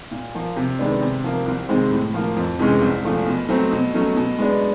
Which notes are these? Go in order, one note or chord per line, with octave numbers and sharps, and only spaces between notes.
A#2
F3 A#3
C3
D#3 G#3 B3 D4
C3
F3 A#3
C2
C3 D#3 G#3 C4
A2
F3 A#3
F2
C3 E3 G#3 C#4
C2
A#2 F3 A3
B2
F#3 A3 C4
B2
F#3 A3 C#4
B2
G#3 B3 D4